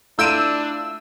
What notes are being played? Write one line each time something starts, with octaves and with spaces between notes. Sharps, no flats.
A3 D4 E4 F4 E6 G6 D7 D#7